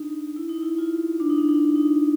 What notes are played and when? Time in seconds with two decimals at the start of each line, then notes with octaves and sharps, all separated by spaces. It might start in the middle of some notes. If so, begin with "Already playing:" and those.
Already playing: D4 D#4
0.36 E4
0.49 D#4
0.63 E4
0.78 F4
1.20 D4
1.30 D#4
1.38 D4
1.49 D#4
1.76 D#4